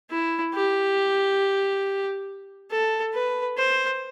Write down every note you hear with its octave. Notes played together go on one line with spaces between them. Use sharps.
E4
G4
A4
B4
C5